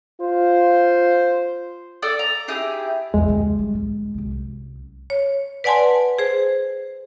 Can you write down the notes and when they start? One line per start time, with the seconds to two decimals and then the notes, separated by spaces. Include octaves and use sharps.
0.21 F4 C5
2.02 A4 D5 D#6 E6
2.19 A#5
2.48 D#4 E4 G4 G#4
3.14 A1 E2 G#3
3.28 D#2 C#3
3.59 G3
3.74 D2 G#2
4.14 C2 F#2
5.10 C#5
5.64 B4 D5 F#5 G#5 A5 C6
6.19 G#4 C5